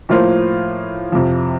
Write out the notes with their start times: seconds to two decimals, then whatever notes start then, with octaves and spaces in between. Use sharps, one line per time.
0.09 A2 F3 A#3 F4 C5
1.12 F2 C3 F3